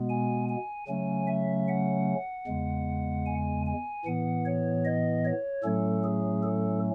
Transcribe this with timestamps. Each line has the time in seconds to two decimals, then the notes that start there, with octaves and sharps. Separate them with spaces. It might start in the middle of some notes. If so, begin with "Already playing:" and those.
Already playing: B2 G#3 B3
0.10 G#5
0.49 G#5
0.88 C#3 F#3 A3 C#4 G#5
1.27 E5
1.68 F#5
2.47 E2 C#3 G#3
3.26 G#5
3.66 G#5
4.05 A2 E3 B3 F#5
4.45 C#5
4.85 D#5
5.25 C#5
5.63 A2 F#3 A3 C#4 A4
6.04 G#4
6.43 A4